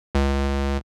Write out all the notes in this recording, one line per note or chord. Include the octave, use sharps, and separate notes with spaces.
C#2